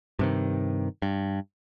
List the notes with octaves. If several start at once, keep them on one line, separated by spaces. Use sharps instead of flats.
G2 C3 D#3
G2